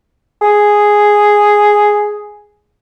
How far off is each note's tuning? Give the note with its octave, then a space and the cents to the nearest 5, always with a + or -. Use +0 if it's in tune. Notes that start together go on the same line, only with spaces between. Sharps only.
G#4 +0